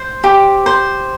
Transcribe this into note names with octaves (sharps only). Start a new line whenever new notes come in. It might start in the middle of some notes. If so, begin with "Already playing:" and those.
Already playing: C5
G4
C5